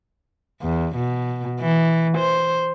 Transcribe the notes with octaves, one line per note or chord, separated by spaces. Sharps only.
E2
B2
E3
C5